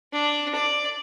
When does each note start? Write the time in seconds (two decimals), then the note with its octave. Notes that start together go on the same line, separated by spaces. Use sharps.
0.13 D4
0.55 D5